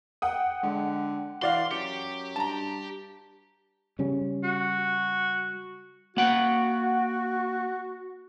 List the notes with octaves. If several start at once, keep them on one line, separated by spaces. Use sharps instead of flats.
F#5 G5 D#6
D3 G#3
E3 F#4 D5 F5 C6
F#2 G4 C#7
G2 A5 A#5
C#3 G3 C#4
F#4
A#3 F#4 F#5 G5